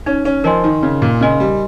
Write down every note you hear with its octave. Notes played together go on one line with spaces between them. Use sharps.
C#4 D#4
C#4
F3 A#4 D#5 G#5 C6
D#3
C#3 D#4
A#2
C#3 A#4 D#5 G#5 C6
G3